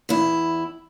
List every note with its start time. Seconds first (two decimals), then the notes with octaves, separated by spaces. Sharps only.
0.09 E2 E4